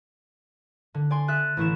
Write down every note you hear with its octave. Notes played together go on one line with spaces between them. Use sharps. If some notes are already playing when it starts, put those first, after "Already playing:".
D3
D5 G#5 C6
E5 D#6 F#6 A6 D#7
A1 E3 E4 C#6 E7